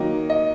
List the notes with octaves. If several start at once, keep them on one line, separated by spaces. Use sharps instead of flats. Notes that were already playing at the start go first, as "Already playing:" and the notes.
Already playing: D#3 F#3 A#3 D#5
D#5